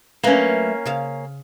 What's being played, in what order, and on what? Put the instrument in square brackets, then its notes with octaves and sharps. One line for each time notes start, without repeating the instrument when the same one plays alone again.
[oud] F#3 A3 B4 [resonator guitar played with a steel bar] A#3 C#4
[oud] C#3 C5 F5